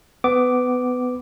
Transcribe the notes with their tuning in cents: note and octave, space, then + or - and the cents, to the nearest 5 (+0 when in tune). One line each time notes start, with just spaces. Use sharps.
B3 +20 D6 +0